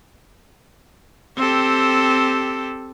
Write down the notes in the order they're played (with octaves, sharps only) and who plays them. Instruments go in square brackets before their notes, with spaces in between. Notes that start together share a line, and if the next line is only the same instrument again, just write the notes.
[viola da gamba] C4 G4 A4